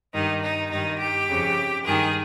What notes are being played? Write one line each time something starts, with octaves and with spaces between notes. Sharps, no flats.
G2 D#3 D#4
D#4
G2 D#3 D#4
G4
F2 C#3
G2 D#3 G#4